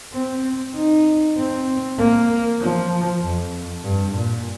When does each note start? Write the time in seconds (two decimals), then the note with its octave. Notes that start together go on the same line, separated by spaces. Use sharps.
0.13 C4
0.75 D#4
1.37 C4
1.98 A#3
2.61 F3
3.22 F2
3.84 G2
4.15 A#2